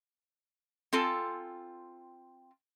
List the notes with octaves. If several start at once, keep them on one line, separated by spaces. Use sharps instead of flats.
C4 F4 A4 G#5